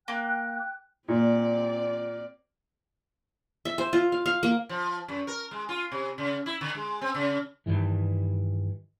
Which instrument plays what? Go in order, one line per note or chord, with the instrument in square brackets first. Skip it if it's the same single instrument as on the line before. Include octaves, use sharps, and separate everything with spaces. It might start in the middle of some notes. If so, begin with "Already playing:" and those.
[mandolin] A#3 [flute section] G5 F#6
[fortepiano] A#2 [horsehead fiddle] C4 D5
[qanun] E5
C5
F4
F5
F5
A#3
[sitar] F3
F#2
A#4
G#3
F4
C3
C#3
E4
D3
G#3
C4
C#3
[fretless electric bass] G2 D#3 E3